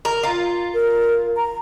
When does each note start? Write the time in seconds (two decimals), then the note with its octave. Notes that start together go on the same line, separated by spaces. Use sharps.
0.05 A#4
0.23 F4
0.74 A#4
1.37 A#5